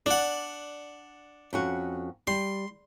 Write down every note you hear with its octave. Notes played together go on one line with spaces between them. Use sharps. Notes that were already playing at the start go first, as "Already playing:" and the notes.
D4 D5 F#5
F2 C#4 F#4
G3 C6